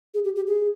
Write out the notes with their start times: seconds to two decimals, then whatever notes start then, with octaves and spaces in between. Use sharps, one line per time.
0.14 G#4
0.25 G4
0.36 G4
0.47 G#4